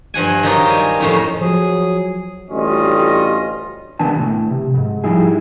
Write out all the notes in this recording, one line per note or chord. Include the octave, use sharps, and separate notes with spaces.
G2 F3 F#5 G#5
D#3 F3 F#3 D#4 F4 G4
G3 G#5
F2 A2 D#3 C#4
F3 F#3 G#4
A1 D2 G3 C#4 F4 D#5
C2 D#3 B3 D4 G#5 A5
A2
C3
F2 G#2
F3 G3 D#4 E4 G#4